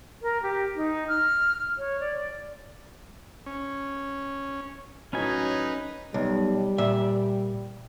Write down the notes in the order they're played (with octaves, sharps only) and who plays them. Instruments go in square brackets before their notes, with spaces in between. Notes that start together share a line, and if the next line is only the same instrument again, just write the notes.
[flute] A#4
G4
D#4
F6
C#5
D5
[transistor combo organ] C#4
[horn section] A2 F#3 [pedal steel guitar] C#4 G#5 [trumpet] D#4 [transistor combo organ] B4
[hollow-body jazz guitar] B1 [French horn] G3
[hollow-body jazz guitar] A#2 E5